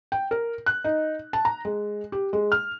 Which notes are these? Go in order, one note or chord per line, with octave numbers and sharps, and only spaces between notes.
G5
A#4
F#6
D#4
A5
A#5
G#3
G4
G#3
F6